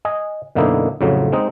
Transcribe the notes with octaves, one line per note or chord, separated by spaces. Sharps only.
D#5 G#5
F#2 B2 D3 A#3 D#4 E4
F2 A2 C#3 F#3
G#3 C4 D#4 D#5